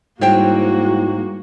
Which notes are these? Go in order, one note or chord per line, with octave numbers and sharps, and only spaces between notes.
G#2 F#3 G3 A#3 E4 F#4 C5 G5